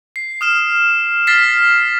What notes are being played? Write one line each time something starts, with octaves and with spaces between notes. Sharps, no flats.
C7
D#6 F6 E7
F6 A6 B6 C7